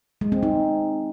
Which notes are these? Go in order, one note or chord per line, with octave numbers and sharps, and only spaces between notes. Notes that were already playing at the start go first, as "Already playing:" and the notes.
G#3
C4
D#4